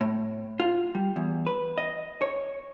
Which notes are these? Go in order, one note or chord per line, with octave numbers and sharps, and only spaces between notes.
A2
F4
G3
E2
B4
D#5
C#5